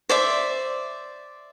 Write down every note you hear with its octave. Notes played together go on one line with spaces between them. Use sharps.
C5 D5 E5